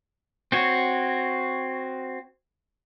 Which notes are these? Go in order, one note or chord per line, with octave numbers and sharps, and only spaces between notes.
C4 F#4 C#5